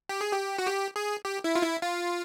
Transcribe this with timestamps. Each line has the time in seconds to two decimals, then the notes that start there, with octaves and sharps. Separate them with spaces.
0.09 G4
0.21 G#4
0.32 G4
0.58 F#4
0.67 G4
0.96 G#4
1.25 G4
1.44 E4
1.55 F4
1.63 E4
1.82 F4